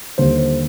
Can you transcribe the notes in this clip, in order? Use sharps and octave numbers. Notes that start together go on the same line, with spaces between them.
D#2 D3 G3 A#3 C5
C5